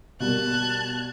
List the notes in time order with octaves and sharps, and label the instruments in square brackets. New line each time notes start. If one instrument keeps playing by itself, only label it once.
[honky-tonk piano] B2 G3 A#3 [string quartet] A5 F#6 G#6